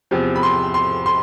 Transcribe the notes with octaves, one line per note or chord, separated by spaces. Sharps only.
E2 C3 F3
B5
C6
C6
C6